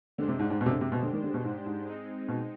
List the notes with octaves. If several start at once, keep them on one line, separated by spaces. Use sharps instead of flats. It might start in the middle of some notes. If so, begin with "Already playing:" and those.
D3 G#3 D4 G4 C5
C3
G#2
G#2
B2
C3
D3
C3
B2
D3
D#3
D3
B2
G#2
G#2
G#3 C4 D#4
B2